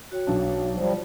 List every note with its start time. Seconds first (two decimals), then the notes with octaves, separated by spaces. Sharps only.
0.11 F#4 C#5 G5
0.27 B1 D4
0.75 F3 G3